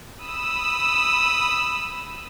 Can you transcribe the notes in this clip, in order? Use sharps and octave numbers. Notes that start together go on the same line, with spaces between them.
B5 D#6 E6